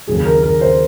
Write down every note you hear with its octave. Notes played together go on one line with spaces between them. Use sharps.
D#2 C#3 F#3 G#4
A#4
A#4
C5